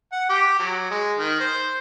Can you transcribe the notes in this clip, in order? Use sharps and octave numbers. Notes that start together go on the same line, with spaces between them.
F#5
G4
F#3
G#3
D#3
C5